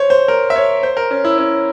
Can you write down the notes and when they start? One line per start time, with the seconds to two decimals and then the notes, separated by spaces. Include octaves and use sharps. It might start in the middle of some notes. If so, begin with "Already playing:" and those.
Already playing: C5 C#5
0.10 C5
0.28 A#4
0.50 E5
0.56 C#5
0.83 C5
0.97 A#4
1.11 C#4
1.24 E4
1.38 C#4